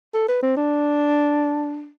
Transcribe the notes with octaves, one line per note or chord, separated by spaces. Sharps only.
A4
B4
C4
D4